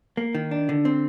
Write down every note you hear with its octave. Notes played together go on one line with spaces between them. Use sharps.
A#3
D#3
D4
D3
C4